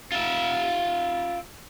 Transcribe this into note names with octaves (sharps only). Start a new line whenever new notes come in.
F4 E5